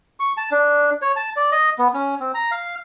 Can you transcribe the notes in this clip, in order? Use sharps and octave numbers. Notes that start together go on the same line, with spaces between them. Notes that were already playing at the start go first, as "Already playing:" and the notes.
C#6
A5
D4
C#5
A5
D5
D#5
B3
C#4
C4
A#5
F5